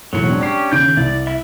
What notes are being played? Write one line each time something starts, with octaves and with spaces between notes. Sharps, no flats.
E1 A2 F#3 C#7
C4 D4
C#4 D4 G4 C7
D#2 C#3 G6 D7
C2 D5
E4 E5